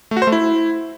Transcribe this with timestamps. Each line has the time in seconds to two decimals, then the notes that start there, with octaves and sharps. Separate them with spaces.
0.11 A3
0.17 F#4
0.22 C5
0.27 A3
0.32 E4